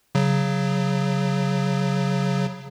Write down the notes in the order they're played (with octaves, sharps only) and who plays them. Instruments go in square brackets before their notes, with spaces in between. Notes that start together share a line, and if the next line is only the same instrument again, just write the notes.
[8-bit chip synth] C#3 F#3